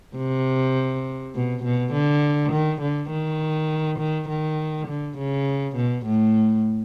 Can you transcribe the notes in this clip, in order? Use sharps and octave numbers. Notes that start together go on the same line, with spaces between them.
C3
B2
B2
D3
D#3
D3
D#3
D#3
D#3
D3
C#3
B2
A2